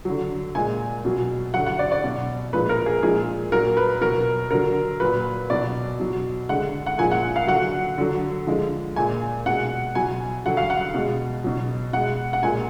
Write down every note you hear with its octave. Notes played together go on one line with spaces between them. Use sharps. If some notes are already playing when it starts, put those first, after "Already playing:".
D3 F#3
A#2 G#3 G#5
B2 F#3
D3 F#3 F#5
F#5
D5
D5
B2 F#3
A#2 F3 G#3 B4
A#4
G#4
A#2 F3 G#3 G#4
A#2 F#3 A#4
B4
B2 F#3 A#4
D3 F#3 A#4
A#2 F#3 B4
B2 F#3 D5
B2 F#3
D3 G#3 F#5
F#5
A#2 F3 G#3 G#5
F#5
F5
D3 F#3 F#5
D3 F#3
D3 F3 G#3
A#2 G#3 G#5
B2 G#3 F#5
B2 F#3 G#5
D3 F#3 F#5
F5
F#5
B2 G#3
B2 F#3
B2 G#3 F#5
F#5
A#2 G#3 G#5